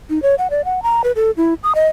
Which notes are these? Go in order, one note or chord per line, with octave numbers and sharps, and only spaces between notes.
D#4
C#5
F#5
D5
F#5
A#5
B4
A4
E4
D#6
D#5